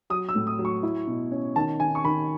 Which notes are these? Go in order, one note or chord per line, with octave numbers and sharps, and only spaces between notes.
F#3 D#6
E6
A2
D#6
F#3
C#6
E4
B2
C#4
D#3 A5
D#3 G#5
C#6
D#3 B5